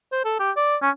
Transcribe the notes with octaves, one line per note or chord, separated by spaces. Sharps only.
C5
A4
G4
D5
C#4